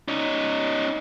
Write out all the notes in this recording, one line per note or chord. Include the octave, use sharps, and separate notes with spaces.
C#4 D#4